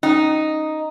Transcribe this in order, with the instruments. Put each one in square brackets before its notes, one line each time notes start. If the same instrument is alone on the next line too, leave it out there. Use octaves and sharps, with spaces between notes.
[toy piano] C#4 [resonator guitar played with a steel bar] D#4